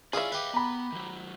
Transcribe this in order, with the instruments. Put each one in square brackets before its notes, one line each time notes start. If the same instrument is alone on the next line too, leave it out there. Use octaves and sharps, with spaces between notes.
[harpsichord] C#4 E4 F4 [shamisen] G#4 E5 [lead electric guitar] D5
[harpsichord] G4 B4 [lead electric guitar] D#5 F5
[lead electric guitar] B3 [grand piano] A#5 B5
[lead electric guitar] D#3 F#3